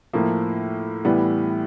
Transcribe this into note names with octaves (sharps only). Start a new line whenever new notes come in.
A2 F3 A#3
A2 E3 G3 B3